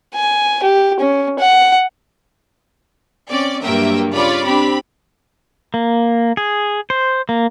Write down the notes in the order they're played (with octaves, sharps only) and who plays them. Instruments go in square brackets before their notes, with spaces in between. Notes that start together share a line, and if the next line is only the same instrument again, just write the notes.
[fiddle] G#5
G4
C#4
F#5
[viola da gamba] C4 C#4 [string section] D5
[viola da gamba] G2 F#3 A#3 [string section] A#4 E5 G5
[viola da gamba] C#3 F4 [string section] C#5 D5 B5
[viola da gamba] C4 D4 G4 [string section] B5
[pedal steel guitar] A#3
G#4
C5
A#3